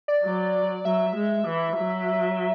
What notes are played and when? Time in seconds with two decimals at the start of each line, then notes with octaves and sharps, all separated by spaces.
0.08 D5
0.23 F#3
0.85 F#3 E5
1.16 G#3
1.47 E3
1.78 F#3